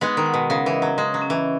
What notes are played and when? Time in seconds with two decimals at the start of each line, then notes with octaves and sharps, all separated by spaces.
0.01 G#3 B3 D#4
0.17 D#3
0.26 F#5
0.34 B2
0.50 C#3 A#4
0.66 E3
0.74 D#5
0.82 F#3
0.98 G#3 C#4
1.14 F#3
1.22 C#4
1.30 E3